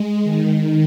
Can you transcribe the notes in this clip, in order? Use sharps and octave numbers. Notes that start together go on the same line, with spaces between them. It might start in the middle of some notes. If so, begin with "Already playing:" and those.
Already playing: G#3
D#3